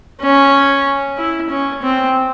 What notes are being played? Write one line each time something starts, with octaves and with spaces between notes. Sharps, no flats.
C#4
E4
C#4
C4